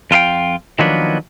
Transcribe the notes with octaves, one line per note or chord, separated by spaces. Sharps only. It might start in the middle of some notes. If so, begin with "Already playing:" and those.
F2 F4 A4 F5 G5
D#3 F3 F#3 A#3 B3 D4